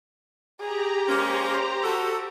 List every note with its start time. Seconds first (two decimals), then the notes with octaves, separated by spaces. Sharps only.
0.60 G4 G#4 A#5
1.08 G#3 A#3 C#4 C5
1.83 F#4 A4